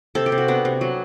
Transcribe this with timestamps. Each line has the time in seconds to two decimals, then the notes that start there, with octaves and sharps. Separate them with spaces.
0.15 C3 A4
0.26 G4
0.32 C3
0.38 F#4
0.48 B3 D4
0.65 C3
0.81 F#3